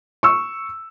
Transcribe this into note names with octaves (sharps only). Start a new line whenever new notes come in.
C#6 E6